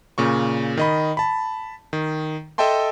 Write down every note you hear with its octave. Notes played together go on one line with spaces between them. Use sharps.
A#2 C#3 C#6
D#3 D#5 B5
A5 B5
D#3
A4 D#5 E5 G5 A5 C6